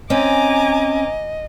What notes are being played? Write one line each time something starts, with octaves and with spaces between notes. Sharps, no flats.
C4 C#4 D#5 G#5 A#5 D6